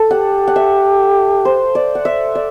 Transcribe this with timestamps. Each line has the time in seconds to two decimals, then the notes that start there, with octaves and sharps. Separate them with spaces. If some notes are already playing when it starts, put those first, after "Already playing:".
Already playing: A4
0.11 G4 F#5
0.47 F#5
0.56 E5
1.45 C5
1.75 D5
1.95 F#5
2.05 E5
2.35 D5